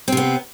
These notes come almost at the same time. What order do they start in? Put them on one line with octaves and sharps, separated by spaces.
C4 C3 B3